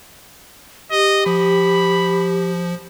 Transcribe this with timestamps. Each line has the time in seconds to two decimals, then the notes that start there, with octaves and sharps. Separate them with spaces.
0.91 G4 D#5
1.26 F3 B5